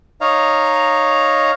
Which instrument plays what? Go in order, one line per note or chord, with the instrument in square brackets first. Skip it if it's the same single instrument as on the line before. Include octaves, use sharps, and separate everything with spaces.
[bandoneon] D#4 C#5 D#5 F5 A#5